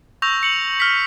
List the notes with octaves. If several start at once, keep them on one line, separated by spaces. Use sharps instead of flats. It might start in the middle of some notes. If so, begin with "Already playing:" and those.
C#6 E6 G6 A#6 F7
C#7 F#7
F6 B6